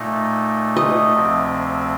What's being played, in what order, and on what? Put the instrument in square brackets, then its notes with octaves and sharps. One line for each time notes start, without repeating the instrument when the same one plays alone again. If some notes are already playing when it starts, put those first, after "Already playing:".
Already playing: [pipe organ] A#2 A3 D#4
[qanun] D#5
[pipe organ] D2 C3 F3 C4